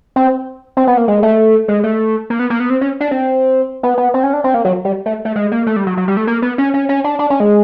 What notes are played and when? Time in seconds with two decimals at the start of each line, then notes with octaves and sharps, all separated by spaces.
0.16 C4
0.77 C4
0.87 B3
0.97 A#3
1.08 G#3
1.23 A3
1.68 G#3
1.84 A3
2.30 A#3
2.39 B3
2.50 A#3
2.60 B3
2.70 C4
2.81 C#4
3.01 D4
3.11 C4
3.83 B3
3.98 B3
4.14 C4
4.24 C#4
4.33 D4
4.44 C4
4.54 A#3
4.65 F#3
4.85 G3
5.06 A3
5.25 A3
5.36 G#3
5.52 A#3
5.67 A3
5.76 G3
5.87 F#3
5.97 F#3
6.08 G3
6.17 A3
6.27 A#3
6.42 B3
6.58 C#4
6.74 C#4
6.89 C#4
7.04 D4
7.19 D4
7.30 C#4
7.40 G#3